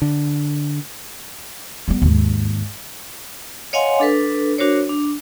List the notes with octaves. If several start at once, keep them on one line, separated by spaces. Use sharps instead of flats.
D3
G3 B3
D#2 G#2
C#5 D#5 F5 F#5 G#5 C6
D4 A4 B4
D4 F#4 A#4 C5 C#5
D4